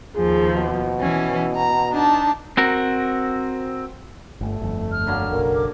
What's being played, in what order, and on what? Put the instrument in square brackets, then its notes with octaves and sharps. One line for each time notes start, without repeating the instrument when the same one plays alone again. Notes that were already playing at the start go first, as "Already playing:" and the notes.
[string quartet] D#2 F3 [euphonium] G#4
[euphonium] B2
[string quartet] E3 C#4
A#5
D4 D#4 A5
[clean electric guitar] C4 F#4 A#4
[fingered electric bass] G1 [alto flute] A3
[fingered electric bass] G1 F2
[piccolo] F6
[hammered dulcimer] D3 F#3 A#3
[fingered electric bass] F#1 B1 [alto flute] A#4
[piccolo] D6